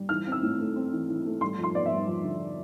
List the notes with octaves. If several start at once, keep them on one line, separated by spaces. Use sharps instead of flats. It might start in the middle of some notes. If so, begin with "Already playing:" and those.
Already playing: G3
E3 F6
C4
E6
A2
A3
C4
E3
E3
A3
G3 C6
F2
C6
B3 D5
E5
G3
F2
D3